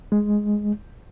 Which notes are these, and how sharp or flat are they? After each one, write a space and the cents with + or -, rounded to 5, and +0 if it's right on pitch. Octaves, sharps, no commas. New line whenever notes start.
G#3 +0